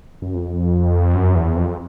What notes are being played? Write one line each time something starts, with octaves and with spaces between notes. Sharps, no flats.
F#2
F2
F#2
E2
F2